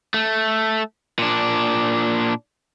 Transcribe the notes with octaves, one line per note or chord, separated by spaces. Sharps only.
A3
A#2 D4